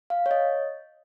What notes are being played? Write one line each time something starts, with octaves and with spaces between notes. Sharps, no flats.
F5
C#5
D#5